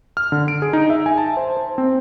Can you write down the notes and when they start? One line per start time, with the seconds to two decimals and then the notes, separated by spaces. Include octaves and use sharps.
0.17 F6
0.32 D3
0.48 D7
0.62 G#4
0.73 D#4
0.90 E5
1.06 G#5
1.18 A5
1.37 C5
1.57 C5
1.78 C4